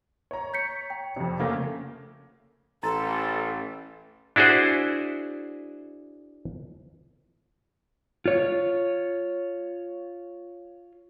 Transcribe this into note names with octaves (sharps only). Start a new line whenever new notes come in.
C#5 A#5
G6 B6 C#7
G5
F2 C3
C#3 A3 A#3
A1 A4 A#5 C6 A6
D4 E4 F#4 G#4 C5
F4 C#5